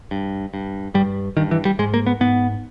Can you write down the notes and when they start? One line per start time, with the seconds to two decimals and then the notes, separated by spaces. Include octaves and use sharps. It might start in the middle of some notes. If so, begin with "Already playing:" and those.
0.11 G2
0.54 G2
0.94 G2 G3
1.37 G2 D#3
1.51 E3
1.65 G3
1.79 G#2 G#3
1.94 A#3
2.07 B3
2.20 G#2 B3